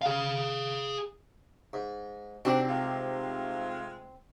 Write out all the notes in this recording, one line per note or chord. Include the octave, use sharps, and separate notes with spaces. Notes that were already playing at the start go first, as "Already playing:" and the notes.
G#4 F5
G#2
C3 C4 D4 D#4 F#4 C5 D6
G#3 A3 F4